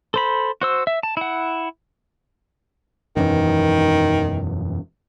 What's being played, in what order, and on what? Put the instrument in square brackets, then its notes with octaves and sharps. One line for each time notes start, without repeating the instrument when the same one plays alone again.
[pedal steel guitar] A4 C5 B5
F#4 C5 E6
E5
A5
E4 F#5
[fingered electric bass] E1 F#2 E3 [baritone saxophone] D#3